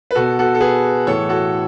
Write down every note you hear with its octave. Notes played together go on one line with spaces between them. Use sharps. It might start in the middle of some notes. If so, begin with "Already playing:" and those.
B4
B2 F#4 A4
F#4 A4
A4
G#4 B4
A2 E3 A4 C#5
F#4 A4